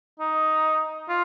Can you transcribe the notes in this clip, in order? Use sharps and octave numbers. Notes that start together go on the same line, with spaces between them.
D#4
F4